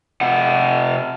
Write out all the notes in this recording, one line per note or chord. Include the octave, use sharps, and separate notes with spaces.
C3 F#5